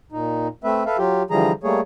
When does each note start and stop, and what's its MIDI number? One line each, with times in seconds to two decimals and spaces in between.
0.12 0.48 46
0.12 0.48 63
0.64 0.83 57
0.64 0.83 60
0.64 0.83 71
0.64 0.83 76
0.86 0.97 69
0.86 0.97 71
0.86 0.97 76
0.86 0.97 77
0.98 1.23 54
0.98 1.23 65
0.98 1.23 67
1.30 1.52 50
1.30 1.52 52
1.30 1.52 53
1.30 1.52 55
1.30 1.52 68
1.30 1.52 82
1.63 1.80 55
1.63 1.80 57
1.63 1.80 58
1.63 1.80 68
1.63 1.80 73